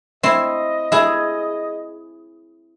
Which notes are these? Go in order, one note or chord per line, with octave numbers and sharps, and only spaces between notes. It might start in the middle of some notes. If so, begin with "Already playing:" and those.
C4 E4 D#5
E4 G#4